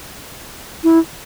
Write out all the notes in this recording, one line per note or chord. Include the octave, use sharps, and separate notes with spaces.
E4